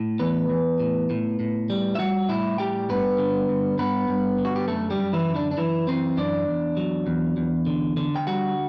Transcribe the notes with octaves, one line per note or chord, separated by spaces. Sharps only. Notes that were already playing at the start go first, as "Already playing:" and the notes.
Already playing: A2
E3 B3 B4
E3
A2
A2
A2
G3
E5
G3 F#4 F#5
A2 E4 E5
G3 G4 G5
G2 B3 B4
D3
G2
G2 B3 B4
G2
D3
F#4
G4
F#2 A3 A4
G3 G4
F#2
E3 E4
F#2
D3 D4
D4
F#2 E3 E4
E3 C4 C5
F#2 D4 D5
E2
F#3
E2
E2
D3
D3
G5
G3 F#4 F#5